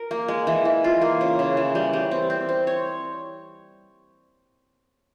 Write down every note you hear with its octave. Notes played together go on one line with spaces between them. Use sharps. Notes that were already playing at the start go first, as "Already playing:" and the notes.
Already playing: A#4
A#3
G#3
E3
E3
F4
A#3
C#3
C#3
E3
G3
G3
C4
C4
C4
C#5